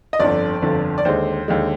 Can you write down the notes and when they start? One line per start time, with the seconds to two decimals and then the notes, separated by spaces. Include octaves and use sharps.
0.13 D#5
0.19 G1 F2 D3 D5
0.62 G1 F2 D3
0.98 D5
1.05 D#2 D3 G#3 C5
1.48 D#2 D3 G#3